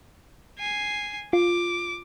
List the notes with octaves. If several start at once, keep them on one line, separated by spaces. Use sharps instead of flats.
G#5 C7
F4 D6